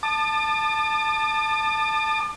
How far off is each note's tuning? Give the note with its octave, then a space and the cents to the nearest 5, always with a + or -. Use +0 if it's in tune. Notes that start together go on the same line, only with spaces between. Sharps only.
A5 +0 D6 +45